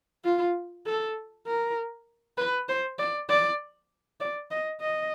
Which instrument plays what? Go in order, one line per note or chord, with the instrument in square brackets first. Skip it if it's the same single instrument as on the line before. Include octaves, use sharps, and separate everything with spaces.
[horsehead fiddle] F4
A4
A#4
B4
C5
D5
D5
D5
D#5
D#5